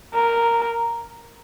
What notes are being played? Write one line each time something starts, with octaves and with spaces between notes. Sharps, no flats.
A#4